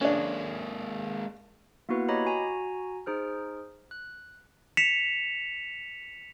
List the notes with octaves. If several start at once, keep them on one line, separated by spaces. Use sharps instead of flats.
G#3 A#3 C#4 D4
A#3 B3 E4 F#4 B4
G4 C#5 D#5 A#5 B5
F#4 G#5 A#5
D#4 G#4 C5 F6
F#6
B6 C#7 E7 F7